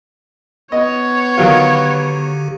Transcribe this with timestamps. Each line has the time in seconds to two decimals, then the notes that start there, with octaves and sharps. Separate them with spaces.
0.72 B3 C#5 D#5
1.37 D3 D#3 F#3 F4 G4